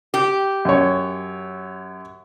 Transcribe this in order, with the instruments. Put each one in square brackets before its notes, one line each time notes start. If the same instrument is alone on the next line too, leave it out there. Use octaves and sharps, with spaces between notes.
[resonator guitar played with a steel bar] G4
[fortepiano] F#2 C#5